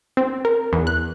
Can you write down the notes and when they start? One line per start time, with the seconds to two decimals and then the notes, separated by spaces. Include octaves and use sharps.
0.17 C4
0.45 A#4
0.73 E2
0.87 F#6